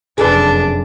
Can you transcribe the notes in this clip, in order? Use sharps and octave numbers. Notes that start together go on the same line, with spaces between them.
F1 F#2 D4 G#4 A4 B4